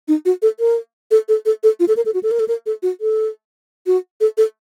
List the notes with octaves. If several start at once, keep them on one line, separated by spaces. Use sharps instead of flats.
D#4
F#4
A4
A#4
A4
A4
A4
A4
F4
A4
A#4
A4
F#4
A4
A#4
A4
A#4
A4
F#4
A4
F#4
A4
A4